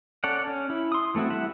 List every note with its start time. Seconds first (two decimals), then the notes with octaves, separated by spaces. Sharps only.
0.24 C#4 A4 C#5 D5 F#5
0.47 C#4
0.70 E4
0.92 C6 D#6
1.15 E3 A3 C4 E4 F#4
1.30 G3 E4 E5 F#5